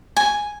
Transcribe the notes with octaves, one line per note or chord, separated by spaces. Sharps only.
G#5